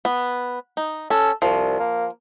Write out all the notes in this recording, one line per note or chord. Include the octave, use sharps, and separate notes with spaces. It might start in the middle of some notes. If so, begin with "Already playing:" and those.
B3
D#4
C#4 A4
C2 F3
A#3